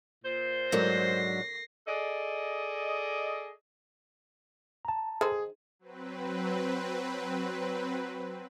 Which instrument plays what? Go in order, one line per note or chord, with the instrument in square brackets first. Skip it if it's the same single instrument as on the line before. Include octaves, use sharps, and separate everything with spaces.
[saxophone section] A#2 C5
[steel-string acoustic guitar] G#2 F#3 D4 [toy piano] A4 A#4 [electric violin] A#6 C7
[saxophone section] G#4 A4 D5 D#5
[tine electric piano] A5 A#5
[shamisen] D#3 A4 C5 [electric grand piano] G#4
[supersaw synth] F#3 C4 B4